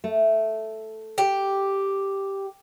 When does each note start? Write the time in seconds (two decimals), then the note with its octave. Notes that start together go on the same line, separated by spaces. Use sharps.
0.04 A3
1.18 G4